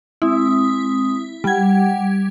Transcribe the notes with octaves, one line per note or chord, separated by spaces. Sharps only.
G#3 C4 E4 D#6
G3 F#5 G5 G#6